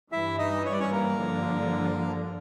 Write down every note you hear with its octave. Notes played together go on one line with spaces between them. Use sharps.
G2 E3 G3 E4 E5
D#4 D#5
C#5
D5
C#4 C#5
A#3 A#4
G2 D3 F3